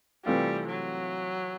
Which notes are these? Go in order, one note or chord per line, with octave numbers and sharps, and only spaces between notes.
C3 E3 G3 A3 C4 F4
F#3